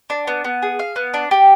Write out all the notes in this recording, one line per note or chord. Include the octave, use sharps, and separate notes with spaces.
D4
B3
B3
G#4
F5
B3
D4
G4